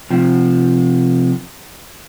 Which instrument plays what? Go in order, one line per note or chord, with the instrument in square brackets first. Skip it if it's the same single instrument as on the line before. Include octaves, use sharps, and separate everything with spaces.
[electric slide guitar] C3 F3